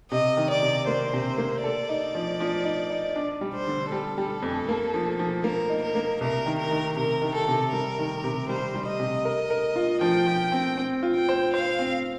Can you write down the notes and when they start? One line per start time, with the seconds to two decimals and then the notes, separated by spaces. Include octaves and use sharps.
0.11 C3 D#5
0.37 D#3
0.50 D5
0.62 C3
0.87 A#3 C5
1.13 C3
1.38 A#3
1.64 A4 D5
1.89 D#4
2.15 F3
2.40 F3
2.65 D#4
2.90 D#4
3.16 D4
3.41 G3
3.54 C5
3.67 D3
3.92 G3 A4
4.18 G3
4.42 F2
4.69 A#3
4.94 F3
5.19 F3
5.44 A#3 A#4
5.70 D#4
5.82 A#4
5.95 A#3
6.21 C2 A#4
6.46 D#3
6.59 A#4
6.71 D#3
6.97 C3 A#4
7.22 D#3
7.34 A4
7.48 C3
7.72 G3 A#4
7.99 D#3
8.24 C3
8.49 G3 C5
8.75 G3
8.87 D#5
9.00 C3
9.25 A#4
9.50 A#4
9.76 F4
10.01 F3 G5
10.26 F3
10.52 C4
10.78 C4
11.03 F4
11.16 G5
11.29 C5
11.53 C5 F5
11.79 C4